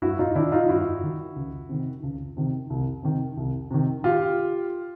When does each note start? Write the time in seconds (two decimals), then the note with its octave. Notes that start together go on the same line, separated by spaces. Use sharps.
0.02 G2 E4 F#4
0.19 D#4 F4
0.35 D#3 D4 E4
0.52 D#4 F4
0.64 F4
0.69 G2 E4 F#4
1.03 D#3
1.36 C#2
1.69 C3 D#3
2.03 C#2
2.37 C3 D#3
2.70 C2
3.03 C3 D#3
3.37 C2
3.71 C3 D#3
4.04 F4 G4